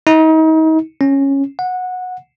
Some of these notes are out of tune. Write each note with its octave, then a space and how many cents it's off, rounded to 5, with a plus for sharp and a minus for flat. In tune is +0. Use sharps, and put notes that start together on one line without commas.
D#4 +35
C#4 -10
F#5 -15